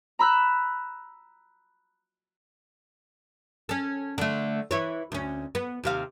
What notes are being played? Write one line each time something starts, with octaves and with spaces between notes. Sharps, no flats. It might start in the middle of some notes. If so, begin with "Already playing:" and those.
A#5 B5 E6 F#6
C#4 A4
D3 A3
E3 E4 C#5
D2 C#4
B3
D#2 C3 F5